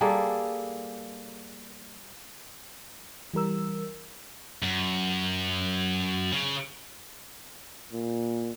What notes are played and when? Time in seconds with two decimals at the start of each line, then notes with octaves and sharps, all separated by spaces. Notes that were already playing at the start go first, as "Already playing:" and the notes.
0.01 G3 A#3 G#4 A4
3.34 E3 G3 A#4 E6
4.63 F#2
6.32 C#3
7.93 A#2